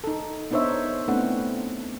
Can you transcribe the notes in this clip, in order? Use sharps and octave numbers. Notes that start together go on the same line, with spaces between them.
D#4 A4
B3 D4 D#4 C5 C#5 E5
A3 B3 C4 D4 E4 F#5